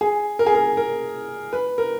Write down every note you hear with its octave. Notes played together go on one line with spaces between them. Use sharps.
G#4
A#4
G#4
A#4
A#4
B4
A#4